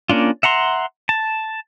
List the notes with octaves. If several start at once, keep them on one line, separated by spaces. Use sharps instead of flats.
A#3 C#4 D4 F4
E5 F#5 A#5 C6
A5